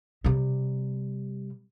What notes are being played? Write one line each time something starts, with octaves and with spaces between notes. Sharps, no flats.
C3 G3